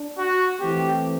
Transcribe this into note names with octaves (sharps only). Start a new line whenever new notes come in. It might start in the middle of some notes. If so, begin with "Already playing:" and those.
Already playing: D4
F#4
E3 A3 C4 G4